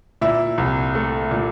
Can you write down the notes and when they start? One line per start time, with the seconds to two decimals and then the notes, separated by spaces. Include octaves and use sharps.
0.21 A#2 E4
0.58 C2
0.95 A3
1.31 A#2